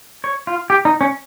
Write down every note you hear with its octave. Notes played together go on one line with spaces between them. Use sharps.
C#5
F4
G4
D#4
C#4